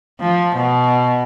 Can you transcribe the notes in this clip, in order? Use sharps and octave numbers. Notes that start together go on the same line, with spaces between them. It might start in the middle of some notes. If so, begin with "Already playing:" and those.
F3
B2